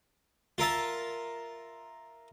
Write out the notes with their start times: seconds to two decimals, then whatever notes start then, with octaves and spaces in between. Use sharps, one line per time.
0.58 F4 A#4 E5 A5